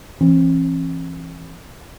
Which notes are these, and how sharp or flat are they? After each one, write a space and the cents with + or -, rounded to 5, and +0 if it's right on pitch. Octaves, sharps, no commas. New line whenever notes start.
E3 +25 C4 +45